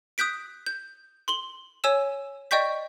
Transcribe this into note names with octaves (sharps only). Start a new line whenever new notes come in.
D#6 F#6 G6 B6 D7
G6
C6 F#7 G7
C#5 G#5 E6 E7
D5 D#5 G5 C#6 G6 B6